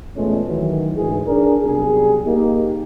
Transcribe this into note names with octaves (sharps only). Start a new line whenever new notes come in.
E2 A#2 E3 G#3 A3 C#4
D#3 E3 F#3
D2 G#2 E3 G#4
D4 G#4 A#4
B1 C3 G3 G#4
A#3 D#4 G4